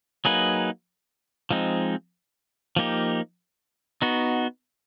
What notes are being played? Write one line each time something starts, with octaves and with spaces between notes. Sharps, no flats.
F#3 A#3 D#4 G#4 B4
F3 G#3 C4 D#4
F3 A#3 D#4 G4
B3 D#4 F#4